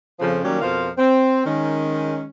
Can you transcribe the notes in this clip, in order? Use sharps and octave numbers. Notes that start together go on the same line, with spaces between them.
F2 C#3 F3
D#3 F#3 G3 A#3 C#4
F2 B2 F3 F4 A#4 F5
C4
D#3 G#3 C#4